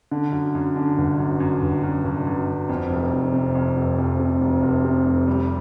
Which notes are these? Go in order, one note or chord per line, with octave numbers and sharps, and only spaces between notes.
D3
F#2
F#2
D3
G1
F#2
F#2
G1
F#2
G1
F#2
F#2
F2
F1
F1
C3
F2
F1
F2
C3
F1
F1
C3
F1
G3